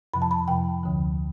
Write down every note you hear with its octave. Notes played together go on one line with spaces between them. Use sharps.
F2 C3 F3 B5
A5
B5
F2 C3 F3 G5
D2 D3 F3